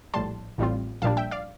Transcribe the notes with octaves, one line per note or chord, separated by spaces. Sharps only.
A#1 A2 G3 A5 C6
A1 A2 G3 C4 F4
A#1 A#2 G3 D4 F5 A5
E5 G5
D5 F5